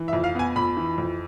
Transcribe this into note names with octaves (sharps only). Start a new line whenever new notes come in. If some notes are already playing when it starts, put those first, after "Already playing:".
Already playing: E3
E5
F2
F5
B3 G#5
F2 B5
E3
F2